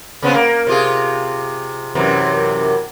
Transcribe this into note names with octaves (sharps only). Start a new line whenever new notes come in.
C#3 B3 C4
A#3
C3 F4 G#4
F#2 C3 E3